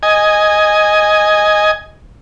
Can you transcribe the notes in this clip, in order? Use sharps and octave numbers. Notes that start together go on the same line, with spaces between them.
D#5 G#5